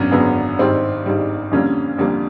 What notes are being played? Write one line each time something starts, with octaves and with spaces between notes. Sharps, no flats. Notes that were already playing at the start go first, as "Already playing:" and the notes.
Already playing: G#1 F#2 D3 F#3 B3 C#4
G#1 F#2 D3 F#3 B3
G#1 G2 D#3 G3 C4
G#1 G2 D#3 G3
F2 D3 G3 A#3 C#4
F2 D3 G3 A#3